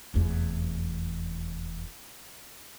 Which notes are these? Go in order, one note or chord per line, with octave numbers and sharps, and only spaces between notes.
F1 E2